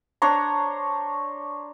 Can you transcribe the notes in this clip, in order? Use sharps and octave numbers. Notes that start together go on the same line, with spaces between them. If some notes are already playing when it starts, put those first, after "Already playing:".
D4 C5 C#5 A#5